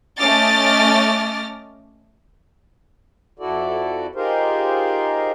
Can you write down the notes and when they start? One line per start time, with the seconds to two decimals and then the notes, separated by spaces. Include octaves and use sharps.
0.17 A3 C#4 D#5 D6 F6 A6
3.39 F2 E4 F#4 A4 D5
4.15 D#4 F4 G4 G#4 A#4 C5